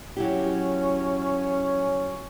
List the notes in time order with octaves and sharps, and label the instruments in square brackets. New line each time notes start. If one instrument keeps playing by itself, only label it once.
[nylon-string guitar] F#3 E4 G4 [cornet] C#4